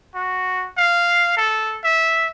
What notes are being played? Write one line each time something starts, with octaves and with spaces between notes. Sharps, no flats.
F#4
F5
A4
E5